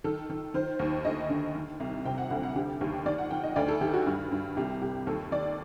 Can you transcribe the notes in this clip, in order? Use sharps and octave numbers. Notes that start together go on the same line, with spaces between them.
D#3 A4
D#3
D#3 C5
D#2
D2 D#5
D3
D#3
C2
C3 G5
F#5
D2 F#5
F#5
D3 G4
D#2 G4
D#3 D5
F#5
D#3 G5
D#5
D2 D5
A4
D#3 G4
F#4
G2
G2
C2 G4
C2 G4
D#2 A4
D#3 D5